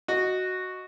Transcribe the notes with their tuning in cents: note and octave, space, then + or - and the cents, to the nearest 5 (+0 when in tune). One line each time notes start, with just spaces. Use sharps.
F#4 +0 D#5 +0